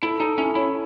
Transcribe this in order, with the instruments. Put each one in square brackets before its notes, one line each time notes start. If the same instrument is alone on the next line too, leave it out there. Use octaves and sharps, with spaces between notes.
[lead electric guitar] E4 [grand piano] A4
[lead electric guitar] D#4 [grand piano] A4
[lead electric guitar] C#4 [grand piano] E4
[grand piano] C#4 [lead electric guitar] E4